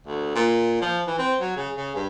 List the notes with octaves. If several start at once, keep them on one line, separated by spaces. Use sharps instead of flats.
D2
A#2
F3
E3
C4
F#3
C#3
C#3
G2